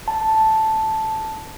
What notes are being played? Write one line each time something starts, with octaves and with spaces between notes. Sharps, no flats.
A5